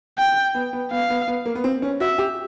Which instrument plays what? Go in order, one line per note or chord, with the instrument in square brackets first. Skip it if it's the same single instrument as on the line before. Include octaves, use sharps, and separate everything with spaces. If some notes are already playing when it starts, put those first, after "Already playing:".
[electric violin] G5
[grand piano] B3
B3
[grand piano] B3 [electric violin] F5
[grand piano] B3
B3
A#3
B3
C4
C#4
[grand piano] F#4 [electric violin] E5
[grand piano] G4